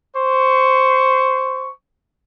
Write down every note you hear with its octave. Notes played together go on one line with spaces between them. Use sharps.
C5 C#6